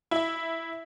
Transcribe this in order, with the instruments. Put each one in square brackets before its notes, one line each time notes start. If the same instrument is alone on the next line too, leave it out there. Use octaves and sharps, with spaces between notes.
[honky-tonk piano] E4 E5